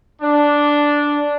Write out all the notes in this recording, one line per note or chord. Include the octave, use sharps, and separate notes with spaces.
D4